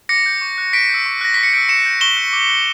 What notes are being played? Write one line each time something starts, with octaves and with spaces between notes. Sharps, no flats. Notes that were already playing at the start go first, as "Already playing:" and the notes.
D6 A#6 C#7
G6
C#6
F#6
C#6 B6 D7
E6 G6
C#6
F#6 A#6
C#6 B6
C#7
E6 G6 B6 D7
C#6 C#7 E7
G6
C#6 E7 G7
F#6
D6
F#6